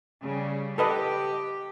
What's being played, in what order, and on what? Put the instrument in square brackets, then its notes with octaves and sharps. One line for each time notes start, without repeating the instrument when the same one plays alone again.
[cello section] C#3 G3
[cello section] G4 [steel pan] A4 B4 D#5